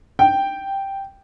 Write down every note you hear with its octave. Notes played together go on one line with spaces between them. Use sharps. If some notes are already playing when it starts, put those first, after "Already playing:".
G5